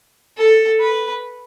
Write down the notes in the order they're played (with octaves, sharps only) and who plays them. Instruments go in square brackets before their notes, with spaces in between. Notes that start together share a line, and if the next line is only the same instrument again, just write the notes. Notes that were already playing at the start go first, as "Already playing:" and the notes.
[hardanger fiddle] A4
B4